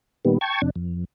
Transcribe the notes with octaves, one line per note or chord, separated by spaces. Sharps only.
A#2 D#3 G3 B3
G5 A5 C#6 G#6
F2 C3 D4
F2